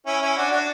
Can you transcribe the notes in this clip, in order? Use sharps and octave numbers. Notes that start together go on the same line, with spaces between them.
C#4 E4
C#4 E4
D4 F#4
D4 F#4